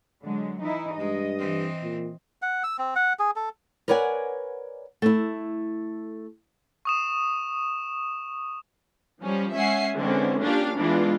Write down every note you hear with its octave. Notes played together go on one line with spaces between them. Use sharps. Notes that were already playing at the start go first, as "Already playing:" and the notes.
D3 F#3 G#3
E3 D#4 E4
G2 G#3 D#5
E3 C4
A#2
F#5
E6
C4
F#5
G#4
A4
A#4 B4 C#5 D5 F#5 G#5
A3 E4
C#6 D#6 E7
F3 G3 C#4
G#3 C#4 E5 F#5 G#5 C7
D3 E3 G#3 C4 C#4
A#3 C#4 D4 F4 G4 F5
E3 G#3 B3 D4 F4